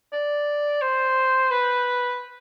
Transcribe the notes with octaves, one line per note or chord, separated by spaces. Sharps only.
D5
C5
B4